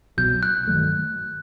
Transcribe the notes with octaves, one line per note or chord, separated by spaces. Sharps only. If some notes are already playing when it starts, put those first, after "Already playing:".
C2 B2 F#3 G6
F#6
G2 D#3 F#3 A3